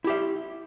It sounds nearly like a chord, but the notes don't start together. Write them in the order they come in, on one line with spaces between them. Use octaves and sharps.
E4 G4 E5